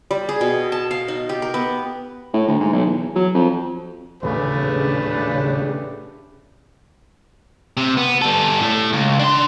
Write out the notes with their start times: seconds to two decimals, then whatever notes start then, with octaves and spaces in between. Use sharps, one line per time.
0.11 G3
0.29 G#4
0.41 B2
0.72 A5
0.91 F5
1.08 D#4
1.29 G4
1.42 A#4
1.54 B3
2.34 A2
2.48 D2
2.60 G#2
2.73 B1
2.85 E2
3.15 F#3
3.34 F2
4.23 D#1 A1 C#3 A3 D4 G4 B4
7.77 C3
7.97 B3
8.22 G3 A4
8.60 A2 A3
8.93 C#2
9.19 D4 C6